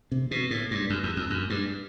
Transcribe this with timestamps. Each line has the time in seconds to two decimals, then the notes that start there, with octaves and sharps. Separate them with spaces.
0.12 C3
0.31 B2
0.51 A2
0.71 G2
0.90 F#2
1.03 E2
1.16 F2
1.30 F#2
1.50 G2